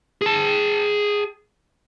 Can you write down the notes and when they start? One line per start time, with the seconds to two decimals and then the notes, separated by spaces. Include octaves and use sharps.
0.22 G#4 A5